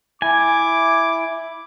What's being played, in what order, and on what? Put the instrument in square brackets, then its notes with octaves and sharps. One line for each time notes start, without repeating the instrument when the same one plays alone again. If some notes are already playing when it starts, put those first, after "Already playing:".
[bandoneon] E4 [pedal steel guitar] G#5 [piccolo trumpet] D6